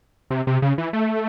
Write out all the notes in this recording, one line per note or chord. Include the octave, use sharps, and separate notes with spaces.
C3
C3
C#3
E3
A3